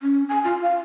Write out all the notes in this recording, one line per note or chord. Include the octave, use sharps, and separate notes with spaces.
C#4
G#5
F4
F5